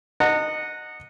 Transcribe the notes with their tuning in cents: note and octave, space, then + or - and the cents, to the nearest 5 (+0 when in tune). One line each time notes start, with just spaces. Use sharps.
D#5 -15 F#5 -10 A#5 -45